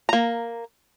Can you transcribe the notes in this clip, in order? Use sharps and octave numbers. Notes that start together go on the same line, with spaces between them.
A#3 A#5